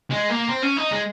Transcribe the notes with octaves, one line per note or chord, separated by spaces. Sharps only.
G#3
A#3
C4
C#4
D#4
G#3